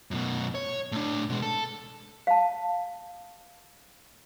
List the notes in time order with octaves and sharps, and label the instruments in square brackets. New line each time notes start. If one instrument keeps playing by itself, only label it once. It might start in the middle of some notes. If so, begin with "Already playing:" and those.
[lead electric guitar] F#2 B2
C#5
A2 D4
B2 G#3
A4
[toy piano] F5 A5